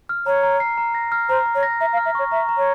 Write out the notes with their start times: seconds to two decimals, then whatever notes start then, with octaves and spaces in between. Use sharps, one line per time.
0.09 F6
0.26 C#5 A#5
0.43 A#5
0.60 C7
0.78 A#5
0.95 A#6
1.12 F6
1.29 C5 A#5
1.46 A#5
1.55 C#5
1.63 A#6
1.80 E5 A#5
1.93 F5
1.97 F6
2.05 E5
2.15 C#5 C#6
2.31 E5 A#5
2.49 A#5
2.57 C#5